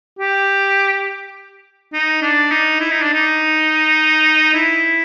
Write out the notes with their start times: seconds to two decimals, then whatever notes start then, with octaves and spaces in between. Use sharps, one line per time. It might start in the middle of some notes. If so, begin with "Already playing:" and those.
0.19 G4
1.93 D#4
2.22 D4
2.51 D#4
2.80 E4
2.91 D#4
3.02 D4
3.13 D#4
4.54 E4